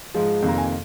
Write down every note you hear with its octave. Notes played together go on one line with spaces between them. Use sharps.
G#2 F3 G#3
F2 C3 D#3 A#3
A#5
G#5